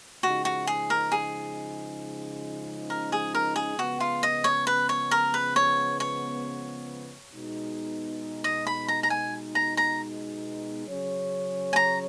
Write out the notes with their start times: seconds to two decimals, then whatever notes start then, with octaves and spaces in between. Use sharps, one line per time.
0.23 C#3 F3 G#3 D#4 F#4
0.45 F#4
0.67 G#4
0.90 A#4
1.12 G#4
2.90 A#4
3.12 G#4
3.35 A#4
3.56 G#4
3.78 C#3 F3 G#3 B3 F#4
4.00 F4
4.23 D#5
4.44 C#5
4.67 B4
4.89 C#5
5.11 A#4
5.34 B4
5.56 C#5
6.00 C#5
7.33 B2 G#3 D#4
8.44 D#5
8.67 B5
8.88 A#5
9.03 A#5
9.10 G#5
9.55 A#5
9.77 A#5
10.87 C#3 F#3 C#4 G#4 C#5
11.73 G#5
11.76 A#5